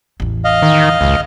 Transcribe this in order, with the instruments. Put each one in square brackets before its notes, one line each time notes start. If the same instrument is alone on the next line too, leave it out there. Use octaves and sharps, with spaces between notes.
[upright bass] A1 E2
[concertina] D#5 F5
[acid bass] D#3
[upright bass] F#1 G#2 [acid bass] C#2